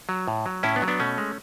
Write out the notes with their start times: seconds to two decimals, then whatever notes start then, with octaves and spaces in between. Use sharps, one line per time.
0.09 F#3
0.28 A2
0.46 F#3
0.63 A2 C#4 E4
0.76 B3 D4
0.82 F#3
0.88 B3 D4
1.00 B2 A3 C#4
1.18 G#3